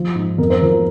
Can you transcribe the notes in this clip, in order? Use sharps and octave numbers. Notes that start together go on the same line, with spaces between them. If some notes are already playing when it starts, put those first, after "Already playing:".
Already playing: F3
G#2
F2 A#4
C5
F3 A#4